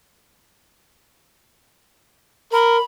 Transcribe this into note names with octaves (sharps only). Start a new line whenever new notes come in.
A#4 B5